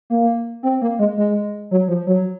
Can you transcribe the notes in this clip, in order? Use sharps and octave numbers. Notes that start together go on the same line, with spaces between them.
A#3
C4
A#3
G#3
G#3
F#3
F3
F#3